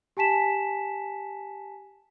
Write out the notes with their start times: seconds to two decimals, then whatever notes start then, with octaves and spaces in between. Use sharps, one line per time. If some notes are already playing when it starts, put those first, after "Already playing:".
0.17 G4 G#5 A5 B6 E7